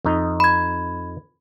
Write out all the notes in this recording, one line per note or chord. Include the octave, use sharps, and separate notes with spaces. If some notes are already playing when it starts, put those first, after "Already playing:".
F2 D#4
B5 G#6